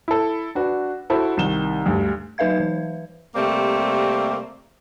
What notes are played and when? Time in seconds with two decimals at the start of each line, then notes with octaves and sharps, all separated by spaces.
0.08 E4 A4
0.55 D4 F#4 B4
1.10 E4 F#4 A4 C5
1.37 C2 D#3 E7 G7
1.86 D2 G2
2.38 F#3 D#4 B4 E5 F5 G#6
2.60 E3
3.35 C3 G3 A3 A#3 C4